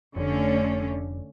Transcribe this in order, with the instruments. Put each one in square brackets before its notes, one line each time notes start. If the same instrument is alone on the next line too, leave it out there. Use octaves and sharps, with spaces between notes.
[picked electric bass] F1 [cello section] D3 A3 C#4